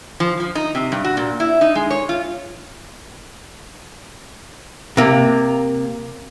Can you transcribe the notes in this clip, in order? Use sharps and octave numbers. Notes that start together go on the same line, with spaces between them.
F3
F3
D#4
C3
G2
F#4
A#2
E4
D#4
G#3
C#5
F4
C3 A#3